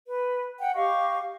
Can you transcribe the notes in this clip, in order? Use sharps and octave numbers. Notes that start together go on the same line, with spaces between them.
B4
F#5 G5
G4 D#5 F5 C#6